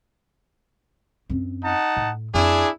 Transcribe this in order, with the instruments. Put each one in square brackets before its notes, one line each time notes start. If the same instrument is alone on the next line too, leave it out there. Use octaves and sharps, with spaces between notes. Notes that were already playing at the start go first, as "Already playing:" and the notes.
[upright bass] F#2 C4
[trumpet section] D#4 F#5 A5
[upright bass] A2
[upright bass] F2 [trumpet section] D4 E4 G#4